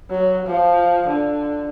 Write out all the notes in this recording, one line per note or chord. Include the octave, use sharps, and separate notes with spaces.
F#3
F3
D3